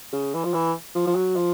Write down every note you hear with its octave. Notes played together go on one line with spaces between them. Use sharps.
C#3
E3
F3
E3
F3
F3
F#3
F3